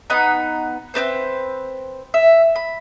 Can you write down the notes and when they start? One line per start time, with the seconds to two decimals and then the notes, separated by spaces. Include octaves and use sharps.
0.10 B3 D#4 F#5 B5
0.94 C4 D4 B4 C5
2.14 E5
2.56 B5